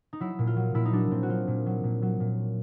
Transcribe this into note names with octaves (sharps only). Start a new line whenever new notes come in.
D#4
F#3 E4
A#2
F4
F#3
A#2 E4
D#4
F#3 D4
A#2 C4
F#4
F#3 F4
A#2
F#3
A#2
F#3
A#2